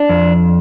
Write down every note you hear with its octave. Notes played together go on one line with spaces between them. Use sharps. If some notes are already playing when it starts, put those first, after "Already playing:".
Already playing: D4
F2